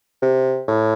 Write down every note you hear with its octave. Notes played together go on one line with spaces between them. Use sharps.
C3
A2